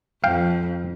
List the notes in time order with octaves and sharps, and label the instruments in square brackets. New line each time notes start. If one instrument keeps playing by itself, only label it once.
[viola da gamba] F2 [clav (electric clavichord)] F5 G5